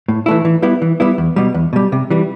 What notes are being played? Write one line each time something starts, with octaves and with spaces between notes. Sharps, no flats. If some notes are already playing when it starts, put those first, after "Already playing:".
A2
E3 A3 E4
E3
G3 B3 E4
E3
G3 B3 E4
E2
B2 G3
E2
B2 G3
C3
E3 G3